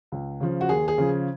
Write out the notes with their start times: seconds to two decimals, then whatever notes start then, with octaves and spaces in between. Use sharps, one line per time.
0.12 C#2
0.41 C#3 F3
0.61 F#4
0.69 D#2 G#4
0.88 G#4
0.98 C#3 F3